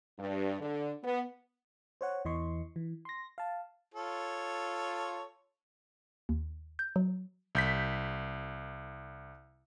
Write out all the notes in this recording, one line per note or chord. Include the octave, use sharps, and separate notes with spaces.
G2
D3
B3
C5 C#5 F#5
E2 E3 D#5 C6 C#6
E3
C6 A#6
F5 A5
F4 A4 C#5
D#2
G6
F#3
C2 G6 B6